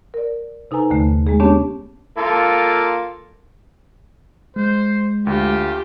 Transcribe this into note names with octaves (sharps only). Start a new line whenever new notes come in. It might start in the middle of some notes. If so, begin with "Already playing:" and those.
A#4 D5
C3 D#4 A4 B4 G#5 A#5
D#2 D3 A3
G#3 A#3 G#4
B3 C#4 D4 G4 C#5 A5
A#3 F4 A4
G#3 C5
D2 F4 G4